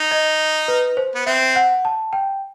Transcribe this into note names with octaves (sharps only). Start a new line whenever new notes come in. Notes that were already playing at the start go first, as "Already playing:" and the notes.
Already playing: D#4
D#5
B4
C5
B3
C4 E5
F#5
A5
G5